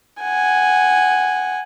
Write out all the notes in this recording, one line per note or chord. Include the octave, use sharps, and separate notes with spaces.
F#5 G#5